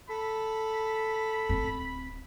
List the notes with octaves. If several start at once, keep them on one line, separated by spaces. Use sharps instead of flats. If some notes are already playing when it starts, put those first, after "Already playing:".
A4 B5
D1 C4